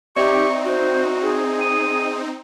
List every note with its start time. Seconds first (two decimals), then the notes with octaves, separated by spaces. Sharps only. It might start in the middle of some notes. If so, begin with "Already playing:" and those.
0.16 C4 D#4 G4 D5 E5 C#6
0.66 F#4 C5
1.22 G#4
1.61 D#6